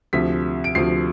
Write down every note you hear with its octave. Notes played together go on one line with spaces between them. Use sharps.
D2 C3 F3 B6
D7
D2 C3 F3 C7